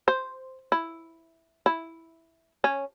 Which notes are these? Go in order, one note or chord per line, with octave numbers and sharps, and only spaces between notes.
C5
E4
E4
C#4